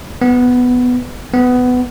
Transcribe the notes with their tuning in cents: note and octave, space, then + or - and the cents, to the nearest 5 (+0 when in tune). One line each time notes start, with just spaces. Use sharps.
B3 +5
B3 +15